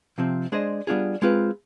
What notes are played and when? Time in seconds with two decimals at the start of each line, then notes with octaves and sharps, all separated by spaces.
0.18 C3 F3 C4
0.52 G#3 D4 G#4 C5 D#5
0.87 G3 B3 D4 F4 G#4
1.22 G#3 C4 F4 B4